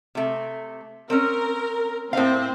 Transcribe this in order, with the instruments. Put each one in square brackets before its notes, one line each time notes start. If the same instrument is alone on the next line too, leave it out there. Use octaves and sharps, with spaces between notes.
[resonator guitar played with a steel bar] C3 A3
[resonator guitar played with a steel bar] C4 C#4 [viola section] A#4
[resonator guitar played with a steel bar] A2 F5 [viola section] C4